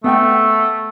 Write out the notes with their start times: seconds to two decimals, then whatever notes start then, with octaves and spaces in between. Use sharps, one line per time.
0.04 A3 B3 F#5 G5